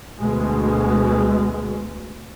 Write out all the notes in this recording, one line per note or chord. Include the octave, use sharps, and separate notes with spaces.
D2 B2 G#3